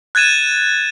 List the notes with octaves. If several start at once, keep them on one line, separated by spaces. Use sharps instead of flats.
F#6 G#6 A6 D#7 E7